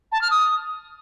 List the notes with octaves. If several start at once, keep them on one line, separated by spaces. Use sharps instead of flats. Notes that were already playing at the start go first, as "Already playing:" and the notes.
A5
F6
D#6